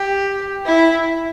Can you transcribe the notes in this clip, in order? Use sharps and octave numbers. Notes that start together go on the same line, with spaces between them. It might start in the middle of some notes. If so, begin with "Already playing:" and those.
Already playing: G4
E4